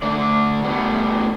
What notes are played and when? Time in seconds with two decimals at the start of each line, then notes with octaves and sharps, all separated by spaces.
0.02 D3 A3 D4 D5
0.64 A2 G3 B3